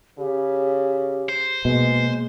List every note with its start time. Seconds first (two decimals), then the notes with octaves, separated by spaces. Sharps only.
0.19 C#3 G4
1.29 C5
1.65 B2 G#3 A#3